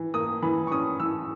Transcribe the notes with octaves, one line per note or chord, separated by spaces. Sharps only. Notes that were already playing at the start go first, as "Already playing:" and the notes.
Already playing: E3
A#3 D#6
E3 B5
C#6
C#4 D#6
E3 E6